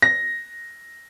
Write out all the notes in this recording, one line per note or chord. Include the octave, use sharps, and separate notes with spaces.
A#6